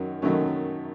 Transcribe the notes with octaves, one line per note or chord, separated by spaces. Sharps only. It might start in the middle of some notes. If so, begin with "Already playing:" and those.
Already playing: F#2 D#3 F#3 C#4
F#2 D#3 F#3 A3 C#4